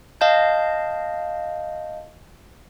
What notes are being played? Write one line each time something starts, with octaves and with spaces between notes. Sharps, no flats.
D#5 F5 A5 G6